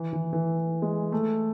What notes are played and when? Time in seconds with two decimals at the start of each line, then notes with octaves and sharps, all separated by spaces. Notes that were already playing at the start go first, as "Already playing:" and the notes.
Already playing: E3
0.13 E3
0.33 E3
0.82 G#3
1.12 A3